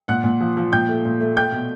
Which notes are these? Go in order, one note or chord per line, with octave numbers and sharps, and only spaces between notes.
A#2 F#5 F#6
A#2
F3
F3
A#2 G5 G6
A3
A#2
A3
A3 G5 G6
B2